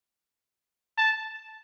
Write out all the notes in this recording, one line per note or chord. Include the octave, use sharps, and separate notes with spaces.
A5